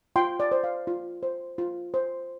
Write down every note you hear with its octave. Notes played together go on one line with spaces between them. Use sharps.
F4 G5 C6
D5
C5
F5
F4
C5
F4
C5